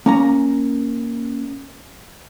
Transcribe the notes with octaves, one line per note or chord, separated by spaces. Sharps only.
A#3 C#4 A#5